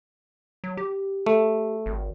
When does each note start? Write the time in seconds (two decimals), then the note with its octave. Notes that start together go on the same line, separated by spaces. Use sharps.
0.64 F#3
0.77 G4
1.26 A3
1.86 G#1